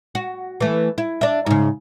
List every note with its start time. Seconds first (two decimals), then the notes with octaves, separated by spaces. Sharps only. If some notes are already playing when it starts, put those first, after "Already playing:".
0.15 F#4
0.61 E3 A3
0.98 E4
1.21 D4 E5
1.46 G#2 C#3